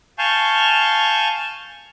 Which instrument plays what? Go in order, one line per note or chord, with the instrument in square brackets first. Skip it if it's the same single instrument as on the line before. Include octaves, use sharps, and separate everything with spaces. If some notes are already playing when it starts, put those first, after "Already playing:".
[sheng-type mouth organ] F5 G#5 A5 C#6 G6